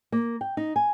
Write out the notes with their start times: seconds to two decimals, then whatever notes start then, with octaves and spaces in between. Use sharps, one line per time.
0.12 A#3
0.41 G5
0.57 D#4
0.76 G#5